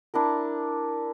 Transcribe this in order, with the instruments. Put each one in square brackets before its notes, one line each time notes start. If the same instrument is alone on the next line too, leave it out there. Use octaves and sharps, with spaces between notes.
[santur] D4 E4 A#4